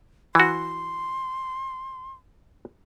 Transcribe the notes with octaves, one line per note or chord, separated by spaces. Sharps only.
E3 F#4 C6